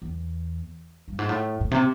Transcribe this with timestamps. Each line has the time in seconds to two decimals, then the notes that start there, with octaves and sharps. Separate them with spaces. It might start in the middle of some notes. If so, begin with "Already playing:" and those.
0.02 E2
1.08 G2
1.19 G#2
1.29 A2
1.61 A2
1.71 C3